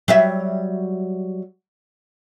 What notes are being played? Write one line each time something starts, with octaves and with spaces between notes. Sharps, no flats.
F#3 G3 E5